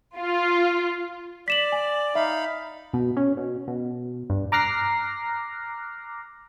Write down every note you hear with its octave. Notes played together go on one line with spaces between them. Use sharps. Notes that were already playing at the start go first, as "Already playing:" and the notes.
F4
D5 B6 E7 F#7
G#5
D#4 E5 F5 B5
B2
C#4
B2
B2
G2
A#5 D6 F6 F#6 A#6 C7